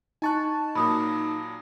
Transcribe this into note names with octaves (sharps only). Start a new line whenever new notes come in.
D#4 G#5 A5 C#6 F#6
A#2 F#3 A#3 B5 D#6